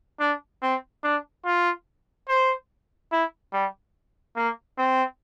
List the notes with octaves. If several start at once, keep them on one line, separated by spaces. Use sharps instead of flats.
D4
C4
D4
F4
C5
E4
G3
A#3
C4